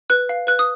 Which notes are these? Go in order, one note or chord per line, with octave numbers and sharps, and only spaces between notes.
B4 F#6
F5
B4 F#6
D#6